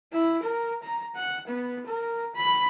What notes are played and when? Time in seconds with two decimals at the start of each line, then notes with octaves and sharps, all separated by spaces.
0.13 E4
0.43 A#4
0.83 A#5
1.15 F#5
1.48 B3
1.87 A#4
2.36 B5